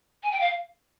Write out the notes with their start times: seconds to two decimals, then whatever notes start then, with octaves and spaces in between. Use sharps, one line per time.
0.23 G#5
0.32 G5
0.40 F5